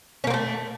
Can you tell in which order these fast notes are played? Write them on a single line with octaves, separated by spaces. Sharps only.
C#4 A#3 C4 A3